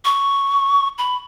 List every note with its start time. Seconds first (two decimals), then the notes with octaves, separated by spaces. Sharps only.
0.05 C#6
0.98 B5